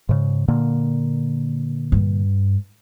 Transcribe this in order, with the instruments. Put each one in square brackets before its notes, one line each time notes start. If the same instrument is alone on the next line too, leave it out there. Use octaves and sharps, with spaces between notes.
[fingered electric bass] G#2 C#3
A#2 D3 A#3
[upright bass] G2